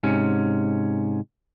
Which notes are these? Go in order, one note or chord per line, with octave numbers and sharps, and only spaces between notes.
G#2 C3 C#4